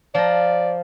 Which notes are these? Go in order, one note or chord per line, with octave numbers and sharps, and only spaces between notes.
F3 D5 A#5